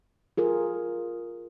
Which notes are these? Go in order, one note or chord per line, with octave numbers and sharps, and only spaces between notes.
F4 G#4 A#4